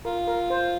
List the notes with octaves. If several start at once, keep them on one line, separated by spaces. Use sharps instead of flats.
F4 A#4
A#4
C5